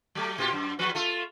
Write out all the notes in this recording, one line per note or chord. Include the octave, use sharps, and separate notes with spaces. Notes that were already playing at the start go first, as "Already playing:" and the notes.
F#3 A3
A#2 F4 G4
F#2
E2 F3 B4
A3 F4